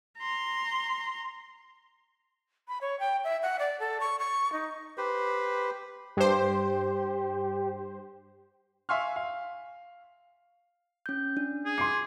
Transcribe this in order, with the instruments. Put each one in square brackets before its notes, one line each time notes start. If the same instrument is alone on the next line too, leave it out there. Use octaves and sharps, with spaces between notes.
[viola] A#5 C6
[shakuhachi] B5
C#5
G5
E5
F#5
D5
A4
C#6
C#6
D#4
[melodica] G4 B4 C5
[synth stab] G2 C5 [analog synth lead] G4
[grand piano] E5 F5 G#5 C6 C#6 F6
F5
[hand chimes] C#4 G6
D4
[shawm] G#4
[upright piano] C6 C7 [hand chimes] D6